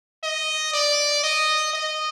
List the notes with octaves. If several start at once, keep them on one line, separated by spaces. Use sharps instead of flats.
D#5
D5
D#5
D#5